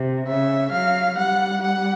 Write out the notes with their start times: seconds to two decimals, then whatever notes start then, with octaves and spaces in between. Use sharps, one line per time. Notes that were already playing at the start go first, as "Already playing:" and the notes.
Already playing: C3
0.27 C#3 E5
0.72 F#3 F5
1.17 G3 F#5
1.62 F#5